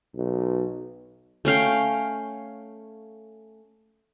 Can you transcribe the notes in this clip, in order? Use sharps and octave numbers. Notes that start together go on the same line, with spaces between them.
B1
A3 C#4 F5 G5